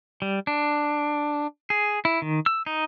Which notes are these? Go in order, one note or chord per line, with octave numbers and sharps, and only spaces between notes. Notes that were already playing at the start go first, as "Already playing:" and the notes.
G3
D4
G#4
E4
D#3
E6
D#4